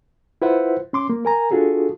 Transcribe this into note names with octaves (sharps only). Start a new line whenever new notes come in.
E4 F4 B4 C5 E5 F#5
C#4 C6 D6
A#3
A#4 G#5 A#5
D4 F4 F#4 G#4 A4